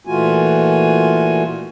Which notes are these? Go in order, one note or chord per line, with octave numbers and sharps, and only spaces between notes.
A#2 E3 A3 F4 F#4 G#5